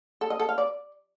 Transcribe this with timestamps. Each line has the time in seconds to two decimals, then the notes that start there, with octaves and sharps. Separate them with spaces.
0.21 A4
0.30 D#5
0.40 A4
0.49 F5
0.58 D5